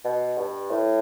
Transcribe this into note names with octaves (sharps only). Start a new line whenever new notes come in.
B2
G2
A2